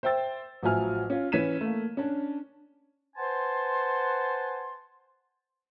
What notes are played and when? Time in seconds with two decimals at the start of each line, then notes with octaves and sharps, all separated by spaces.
0.03 C5 E5 G5 E6 A6
0.63 A1 F3 F#3 E5 G#5 F6
1.10 C#4 F4
1.32 E3 C#4 G#6 B6 D#7 E7
1.61 A3 A#3
1.97 C#4 D4
3.17 B4 C5 F#5 G#5 A5 C6